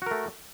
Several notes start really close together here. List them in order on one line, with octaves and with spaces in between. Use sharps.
F#4 A#4 A3